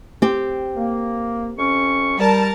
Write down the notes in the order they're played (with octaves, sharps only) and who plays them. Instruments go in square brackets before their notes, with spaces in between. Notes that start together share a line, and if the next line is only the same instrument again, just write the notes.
[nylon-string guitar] C4 G4
[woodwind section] A#3
F2 C#4 C#6
[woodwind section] G3 [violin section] A#4 A5